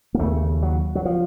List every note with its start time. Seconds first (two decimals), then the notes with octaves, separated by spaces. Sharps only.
0.14 A#3
0.19 D#2 C#3 A3
0.62 F#3
0.95 F#3
1.05 F3